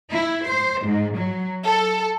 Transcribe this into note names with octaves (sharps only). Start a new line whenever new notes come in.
E4
C5
G#2
F#3
A4